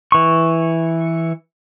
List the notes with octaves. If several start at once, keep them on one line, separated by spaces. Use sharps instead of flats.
E3 C#6